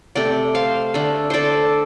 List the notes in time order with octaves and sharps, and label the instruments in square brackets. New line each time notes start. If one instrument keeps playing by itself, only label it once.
[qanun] C3 A3 D5 G5
C5 F5
D3 A3
A4 C5 D5